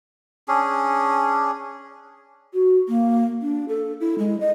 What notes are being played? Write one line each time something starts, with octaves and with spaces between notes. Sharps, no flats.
C#4 D4 G#4
F#4
A#3
D4
A4
E4
G#3
D#5